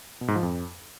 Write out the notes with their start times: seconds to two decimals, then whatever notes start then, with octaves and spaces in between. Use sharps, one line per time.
0.21 B2
0.28 G#2
0.36 F3
0.43 F2